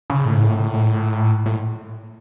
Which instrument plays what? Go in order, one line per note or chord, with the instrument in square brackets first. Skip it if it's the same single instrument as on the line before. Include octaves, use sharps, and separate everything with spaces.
[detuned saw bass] C#3
A2
G#2
A2
A2
A2
A2